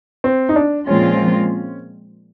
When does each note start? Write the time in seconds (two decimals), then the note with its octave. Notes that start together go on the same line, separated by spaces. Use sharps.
0.24 C4
0.49 D#4
0.56 D4
0.87 A#2 F3 G#3 C4 C#4 F4